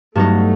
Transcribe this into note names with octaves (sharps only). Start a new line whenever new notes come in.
G2 F#3 A3 B3 D#4